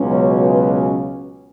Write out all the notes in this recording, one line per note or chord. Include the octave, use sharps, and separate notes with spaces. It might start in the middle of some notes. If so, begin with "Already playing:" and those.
Already playing: C#2 B2 F#3 C#4
C#5
B4